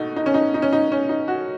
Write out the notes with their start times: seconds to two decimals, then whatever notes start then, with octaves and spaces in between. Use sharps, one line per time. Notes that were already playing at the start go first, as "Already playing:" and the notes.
Already playing: B2 A3 D#4
0.16 D#4
0.26 C#4
0.34 D#4
0.54 D#4
0.62 C#4
0.73 D#4
0.92 C#4
1.09 D#4
1.28 F#4